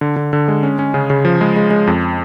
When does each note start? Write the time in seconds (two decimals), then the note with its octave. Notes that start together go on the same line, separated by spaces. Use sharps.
0.01 D3
0.16 D3
0.33 D3
0.48 G#3
0.63 C#4
0.79 C#4
0.94 C#3
1.10 C#3
1.25 F3
1.41 G#3
1.56 G#3
1.71 G#3
1.87 F2